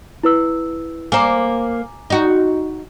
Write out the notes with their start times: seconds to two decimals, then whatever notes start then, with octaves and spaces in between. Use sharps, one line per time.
0.23 E4 B4 E6
1.12 A#3 C5 G#5 A#5 D6
2.10 D#4 F#4